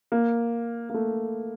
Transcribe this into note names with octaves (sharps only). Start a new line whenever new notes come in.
A#3
A#3
A3